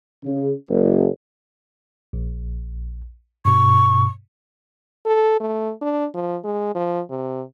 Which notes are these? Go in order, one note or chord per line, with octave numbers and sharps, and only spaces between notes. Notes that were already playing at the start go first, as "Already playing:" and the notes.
C#3
F#1
A#1
G2 B2 C#6
A4
A3
D4
F3
G#3
F3
C3